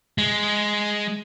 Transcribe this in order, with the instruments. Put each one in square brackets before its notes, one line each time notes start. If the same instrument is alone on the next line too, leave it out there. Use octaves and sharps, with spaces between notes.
[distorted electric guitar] G#3